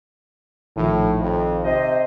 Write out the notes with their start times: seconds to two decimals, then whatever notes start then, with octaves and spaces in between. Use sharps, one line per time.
0.76 A#1 A2 D#3 F3
1.20 F2
1.64 C3 C5 D#5